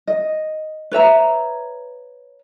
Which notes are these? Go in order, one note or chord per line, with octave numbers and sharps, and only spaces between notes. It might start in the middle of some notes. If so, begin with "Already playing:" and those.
D#5
B4 C#5 E5 A#5